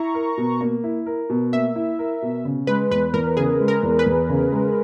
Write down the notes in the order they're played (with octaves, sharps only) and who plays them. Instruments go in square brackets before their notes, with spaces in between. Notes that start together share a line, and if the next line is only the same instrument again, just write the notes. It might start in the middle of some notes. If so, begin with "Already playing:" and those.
Already playing: [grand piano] E4 [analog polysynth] A#5 C#6
[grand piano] A#4
B2
A#3
E4
A#4
B2
[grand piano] A#3 [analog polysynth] E5
[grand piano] E4
A#4
B2
C#3
[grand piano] G#3 [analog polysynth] B4
[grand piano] E2 [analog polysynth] B4
[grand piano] E2 [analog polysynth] A#4
[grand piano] C#3 [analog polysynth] G#4
[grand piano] G#3
[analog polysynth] A#4
[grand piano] E2
[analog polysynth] B4
[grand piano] E2
C#3
G#3